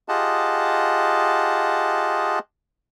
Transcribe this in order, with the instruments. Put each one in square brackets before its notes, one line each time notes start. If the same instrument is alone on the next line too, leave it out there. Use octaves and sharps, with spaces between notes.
[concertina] F4 G4 G#4 D#5 F#5 A5